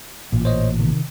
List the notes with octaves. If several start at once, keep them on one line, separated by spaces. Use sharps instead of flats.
A1 A#2
C5 C#5 D#5
C3 D#3